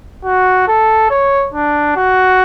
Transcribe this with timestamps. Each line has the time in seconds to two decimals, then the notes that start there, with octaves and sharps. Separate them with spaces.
0.25 F#4
0.68 A4
1.10 C#5
1.54 D4
1.97 F#4